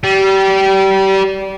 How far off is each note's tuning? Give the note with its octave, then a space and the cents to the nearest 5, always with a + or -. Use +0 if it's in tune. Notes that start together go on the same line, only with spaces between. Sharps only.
G3 -25